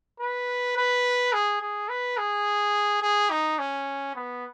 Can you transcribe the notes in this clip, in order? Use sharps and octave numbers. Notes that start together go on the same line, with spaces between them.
B4
B4
G#4
G#4
B4
G#4
G#4
D#4
C#4
B3